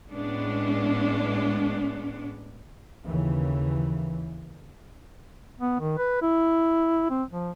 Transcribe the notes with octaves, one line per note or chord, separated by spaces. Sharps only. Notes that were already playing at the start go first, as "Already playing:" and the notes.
A2 G#3 B3 C#4 D4
D#2 C#3 E3
B3
D#3
B4
E4
C4
F3